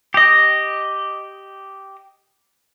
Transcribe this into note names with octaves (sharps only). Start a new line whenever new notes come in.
G4 D#5